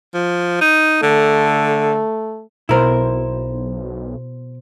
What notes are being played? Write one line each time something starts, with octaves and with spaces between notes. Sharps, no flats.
F3
D#4
D3 A3
B1 B2 E4 A#4 C5